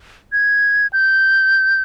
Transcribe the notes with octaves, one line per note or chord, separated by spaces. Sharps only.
G#6
G6